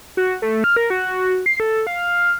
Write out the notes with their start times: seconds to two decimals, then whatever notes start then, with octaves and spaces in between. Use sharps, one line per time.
0.17 F#4
0.42 A3
0.64 F6
0.76 A#4
0.90 F#4
1.46 C7
1.60 A4
1.87 F5